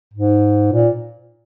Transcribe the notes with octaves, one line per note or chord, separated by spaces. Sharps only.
G#2
A#2